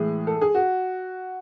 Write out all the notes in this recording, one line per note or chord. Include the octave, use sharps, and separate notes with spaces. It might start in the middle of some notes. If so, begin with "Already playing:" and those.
Already playing: A2 E3 G#3 G#4
A4
G#4
F#4